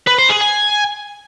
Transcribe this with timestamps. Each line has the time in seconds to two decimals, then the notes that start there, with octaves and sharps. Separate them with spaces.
0.07 B4
0.18 C5
0.30 G#4
0.41 G#5